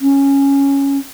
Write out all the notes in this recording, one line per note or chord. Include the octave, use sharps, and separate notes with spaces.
C#4